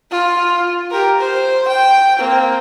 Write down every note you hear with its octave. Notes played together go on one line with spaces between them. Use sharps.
F4
G4 A#4
C5
G5
A#3 C4